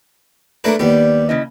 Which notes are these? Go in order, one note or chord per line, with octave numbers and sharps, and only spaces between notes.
A3 A#3 D4 A#4 B4
D#2 G3 B3
C#3 E4 D#5